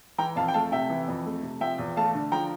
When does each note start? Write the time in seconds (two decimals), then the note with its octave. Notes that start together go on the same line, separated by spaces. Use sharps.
0.18 E3 G5 A#5
0.36 F2 F5 A5
0.48 G5
0.54 A3 F5 A5
0.72 C3 E5 G5
0.90 E3
1.08 F2
1.26 A3
1.43 C3
1.61 F3 E5 G5
1.78 E2
1.97 A3 F5 A5
2.14 D3
2.32 F3 G5 A#5